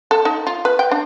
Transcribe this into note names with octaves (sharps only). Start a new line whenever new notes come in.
A4
D#4
F4
B4
G5
D4